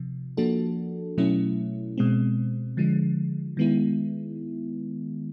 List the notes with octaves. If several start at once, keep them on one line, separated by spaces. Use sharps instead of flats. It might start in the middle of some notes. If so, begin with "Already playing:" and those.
Already playing: C3 F3
F3 A#3 D4 F#4 A4
B2 F#3 A3 C#4 E4
B2 G#3 C4
D3 F3 G#3
D#3 G#3 B3 E4